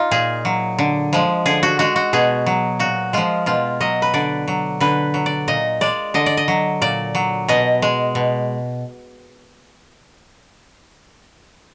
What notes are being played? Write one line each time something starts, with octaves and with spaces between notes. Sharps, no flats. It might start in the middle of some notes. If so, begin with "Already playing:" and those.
Already playing: D#4 F4
A#2 G#4
F#3
D3
F3 G#3
D3 G#4
F#4
G#3 F#4
F#4
B2 G#4
F#3
A#2 F#4
F3 G#3 F4
B2 F4
F#3 D#5
B4
D3 D5
F#3
D3 B4
F#3
D5
A#2 D#5
G#3 D5
D3 D#5
D5
D#5
F#3
A#2 D5
F#3
B2 D#5
G#3
B2